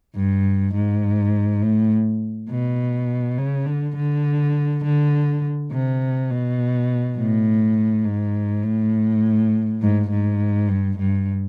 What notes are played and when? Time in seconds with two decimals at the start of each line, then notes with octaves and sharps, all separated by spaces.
0.16 G2
0.74 G#2
1.63 A2
2.50 B2
3.38 C#3
3.66 D3
3.96 D3
4.84 D3
5.71 C3
6.30 B2
7.17 A2
8.05 G#2
8.64 A2
9.81 G#2
10.10 G#2
10.69 G2
10.98 G2